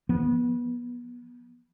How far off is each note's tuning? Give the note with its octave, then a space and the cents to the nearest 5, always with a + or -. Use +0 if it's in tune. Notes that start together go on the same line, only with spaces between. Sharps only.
F3 +0 B3 -25